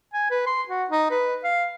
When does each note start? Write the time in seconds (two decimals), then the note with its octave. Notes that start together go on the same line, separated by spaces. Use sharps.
0.14 G#5
0.31 B4
0.47 C6
0.69 F#4
0.90 D#4
1.11 B4
1.44 F5